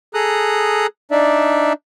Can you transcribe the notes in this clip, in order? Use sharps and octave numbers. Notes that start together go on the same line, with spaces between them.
G#4 A4 A#5 D#6 F#6
D4 D#4 D5 E5